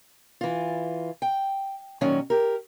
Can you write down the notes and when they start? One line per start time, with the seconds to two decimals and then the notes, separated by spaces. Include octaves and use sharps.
0.41 E3 F4
1.22 G5
2.01 A#2 D#3 F#3 C#4
2.30 G4 A#4